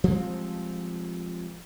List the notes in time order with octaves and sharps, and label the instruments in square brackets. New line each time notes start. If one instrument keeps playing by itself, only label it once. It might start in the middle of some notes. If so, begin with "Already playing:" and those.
[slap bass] F3 G3 G#3 C4